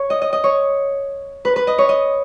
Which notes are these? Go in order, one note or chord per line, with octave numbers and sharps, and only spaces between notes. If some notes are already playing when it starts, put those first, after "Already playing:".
Already playing: C#5
D#5
D#5
D#5
C#5
B4
B4
D#5
C#5
D#5